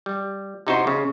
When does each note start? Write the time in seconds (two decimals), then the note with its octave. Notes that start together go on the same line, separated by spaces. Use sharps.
0.06 G3
0.67 C3 C#4 D#4 E4 F#4 C5
0.87 C#3